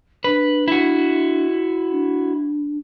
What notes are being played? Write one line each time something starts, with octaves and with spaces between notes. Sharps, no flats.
D4 B4
E4 F#4
D4